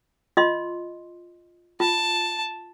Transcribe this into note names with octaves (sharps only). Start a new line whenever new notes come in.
F4 D#5 C6
F4 A5